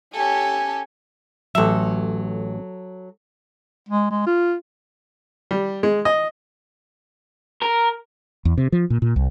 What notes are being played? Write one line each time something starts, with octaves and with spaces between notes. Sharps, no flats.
C#4 G4 A4 G#5
A1 F#3 A4 E5
G#3
G#3
F4
G3
G#3
D#5
A#4
E2
C3
F3
A#2
A#2
C2